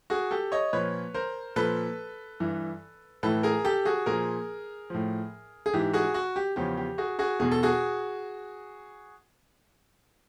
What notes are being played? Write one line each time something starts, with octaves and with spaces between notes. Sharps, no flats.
F#4 G#4
G4 A4
C#5 D#5
A#2 F3 B4 C#5
A#4 C5
A#2 F3 A4 B4
G2 E3
A2 E3 A4 B4
G#4 A#4
G4 A4
F#4 G#4
A#2 F3 G#4 A#4
A2 F3
G#4
G#2 E3 G4
F#4 G#4
F#4
G4
E2 C#3 F3 G4
G4
F#4 G#4
F#4 G#4
E2 B2 G#4
A4
F#4 G#4